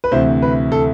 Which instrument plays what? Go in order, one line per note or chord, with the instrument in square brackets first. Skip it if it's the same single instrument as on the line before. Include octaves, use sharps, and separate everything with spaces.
[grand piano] B4
D2 C3 E3 C5
B4
A4